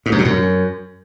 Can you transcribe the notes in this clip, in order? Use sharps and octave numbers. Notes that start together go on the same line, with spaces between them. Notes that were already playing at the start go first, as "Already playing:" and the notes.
G#2
F#2
B2
F#2